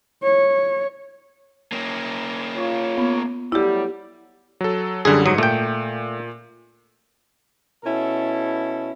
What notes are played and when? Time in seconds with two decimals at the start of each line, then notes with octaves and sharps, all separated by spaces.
0.23 C#5
1.72 A#3 C#4
2.55 F4 C#5
2.98 B3
3.52 A2 F#3 G3 E4 G4
4.61 F#3 A4
5.05 F#2 D3 G3 G#4
5.26 G#2 F#3 D#6 C#7
5.38 A#2 A3 G5
7.84 B2 C#4 E4 A4